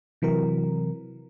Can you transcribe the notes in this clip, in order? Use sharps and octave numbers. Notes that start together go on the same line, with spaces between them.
C3 E3 F#3 A#4